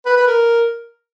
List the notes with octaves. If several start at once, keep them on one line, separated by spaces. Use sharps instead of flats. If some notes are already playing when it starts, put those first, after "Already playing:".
B4
B4
A#4